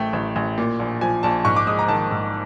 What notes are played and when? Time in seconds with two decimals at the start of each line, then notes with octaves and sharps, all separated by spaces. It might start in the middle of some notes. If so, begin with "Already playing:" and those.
Already playing: A1 A3 G5
0.13 A1
0.36 A1
0.58 A#2
0.80 A#1
1.01 F3 G#5
1.23 A#1 A5
1.45 G#2 C#6
1.56 D6
1.67 G#3 D#6
1.79 A#5
1.88 D#3 A5
2.11 G#2